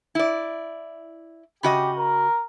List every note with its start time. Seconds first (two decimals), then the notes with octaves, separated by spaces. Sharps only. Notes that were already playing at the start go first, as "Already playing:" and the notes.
0.15 E4 D5
1.63 C#3 F#4 G4 D#5
1.97 A#4